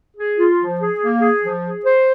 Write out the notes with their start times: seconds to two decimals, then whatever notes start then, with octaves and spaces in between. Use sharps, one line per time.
0.17 G#4
0.38 F4
0.59 F3
0.80 G#4
1.00 A#3
1.21 G#4
1.43 F3
1.63 G#4
1.85 C5